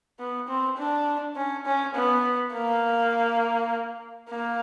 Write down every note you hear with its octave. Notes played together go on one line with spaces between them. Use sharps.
B3
C4
D4
C#4
C#4
B3
A#3
A#3